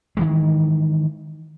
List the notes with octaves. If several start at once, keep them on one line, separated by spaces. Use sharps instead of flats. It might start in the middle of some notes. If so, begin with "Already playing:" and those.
D#3 E3 G#3